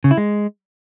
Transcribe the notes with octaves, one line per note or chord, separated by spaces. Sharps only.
C#3
E4
G#3